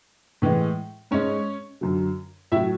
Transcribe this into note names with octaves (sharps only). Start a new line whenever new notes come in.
A2 E3 G#3
G#2 G#3 C#4 C#5
F#2 D3 F#3
A2 F#3 E4 E5